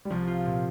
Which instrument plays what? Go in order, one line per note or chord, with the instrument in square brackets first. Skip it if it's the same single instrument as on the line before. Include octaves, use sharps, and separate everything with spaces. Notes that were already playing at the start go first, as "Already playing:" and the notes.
[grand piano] G3
[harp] C2 [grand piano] F3
[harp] F4
A#2